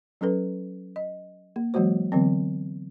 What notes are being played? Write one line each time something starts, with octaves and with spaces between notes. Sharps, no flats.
F#3 C#4 A4 B4
D#5
A#3
E3 F#3 G#3 A#3 F#4 C5
D3 E3 F#3 B3 C4